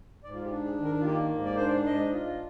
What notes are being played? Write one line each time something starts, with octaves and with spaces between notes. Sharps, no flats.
G#2 D5
F4
G4
D4
G#4
D#3
A#4
F4
A#3 G4
G#2
D5
D4 C5
D5
G#2 D#5
F4